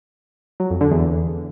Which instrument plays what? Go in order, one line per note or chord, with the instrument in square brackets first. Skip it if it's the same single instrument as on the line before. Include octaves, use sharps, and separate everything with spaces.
[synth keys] F#3
F2
D3
E2